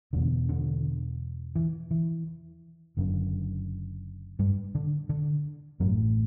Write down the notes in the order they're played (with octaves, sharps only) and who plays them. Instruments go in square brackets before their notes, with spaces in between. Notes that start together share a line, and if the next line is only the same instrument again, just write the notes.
[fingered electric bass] E1 E2 B2 D3
D3
E3
E3
F#1 F#2 D3
G2 G3
D3
D3
A1 F#2 A2 F#3